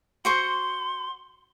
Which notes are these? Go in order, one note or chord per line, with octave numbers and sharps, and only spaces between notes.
F#4 C5 C6 C#6